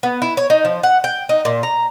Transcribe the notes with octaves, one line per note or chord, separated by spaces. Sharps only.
B3
E4
C#5
D#4
F3
F#5
G5
D#4
A#2
A#5